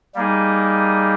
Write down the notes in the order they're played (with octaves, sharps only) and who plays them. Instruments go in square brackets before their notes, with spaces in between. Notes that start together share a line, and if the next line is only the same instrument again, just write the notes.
[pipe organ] G3 A#3 D#4 G#4